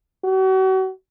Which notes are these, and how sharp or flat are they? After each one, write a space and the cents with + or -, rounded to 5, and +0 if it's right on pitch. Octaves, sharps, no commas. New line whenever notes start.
F#4 +40